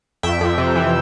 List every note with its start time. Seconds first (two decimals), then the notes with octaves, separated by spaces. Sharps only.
0.23 F2 E5 G5
0.41 F2
0.58 C3
0.75 E3